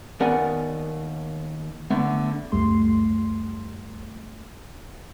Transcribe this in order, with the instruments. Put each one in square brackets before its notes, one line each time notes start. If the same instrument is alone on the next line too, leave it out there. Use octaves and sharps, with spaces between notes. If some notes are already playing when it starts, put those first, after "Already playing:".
[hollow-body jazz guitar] D#2 B3 A#4 D5 F#5 G#5
D3 A3 B3
[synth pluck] C#2 F#2 G3 A3 C6